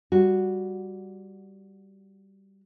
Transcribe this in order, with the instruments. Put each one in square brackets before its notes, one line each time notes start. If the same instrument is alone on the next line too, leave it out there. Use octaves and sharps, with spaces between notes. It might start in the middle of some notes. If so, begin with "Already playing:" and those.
[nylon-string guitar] G3 F#4